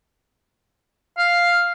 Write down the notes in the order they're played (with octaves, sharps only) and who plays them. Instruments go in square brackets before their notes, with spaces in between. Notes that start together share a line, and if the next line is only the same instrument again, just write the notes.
[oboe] F5